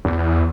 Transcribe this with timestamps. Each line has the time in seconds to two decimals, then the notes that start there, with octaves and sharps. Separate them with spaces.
0.05 E2